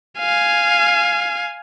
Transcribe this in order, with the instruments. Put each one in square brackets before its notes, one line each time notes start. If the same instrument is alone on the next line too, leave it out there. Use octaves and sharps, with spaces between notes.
[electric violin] F5 G#5